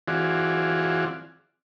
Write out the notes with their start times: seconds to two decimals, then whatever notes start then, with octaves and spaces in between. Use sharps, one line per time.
0.08 E3 C4 F4 F#4 G#4 D5